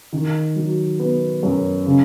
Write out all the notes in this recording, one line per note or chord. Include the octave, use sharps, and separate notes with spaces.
D#3
F#3
B3
F#2
C#3